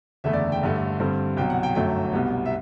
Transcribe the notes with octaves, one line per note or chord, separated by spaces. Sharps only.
F#1 E2 D3 A3 E5
D5
G5
G1 G2 D3 A3
G2 D3 G3 C4
C2 B2 F#3 G5
F#5
G5
G1 F#2 F#3 A3 G5
C2 B2 G3 B3
E5